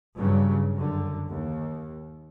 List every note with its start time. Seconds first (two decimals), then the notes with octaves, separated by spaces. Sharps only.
0.16 G2 C#3 F#3
0.75 F#2 D3
1.30 D#2